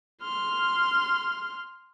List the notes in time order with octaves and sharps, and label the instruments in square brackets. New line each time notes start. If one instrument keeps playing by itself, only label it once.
[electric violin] C6 F6